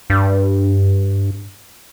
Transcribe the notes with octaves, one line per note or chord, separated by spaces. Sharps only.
G2